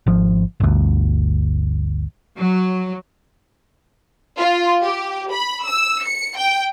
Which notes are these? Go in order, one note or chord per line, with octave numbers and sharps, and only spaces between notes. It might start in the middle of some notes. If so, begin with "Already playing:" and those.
G#1 F3
G1 D2
F#3
F4
G4
B5
E6
C#7
G5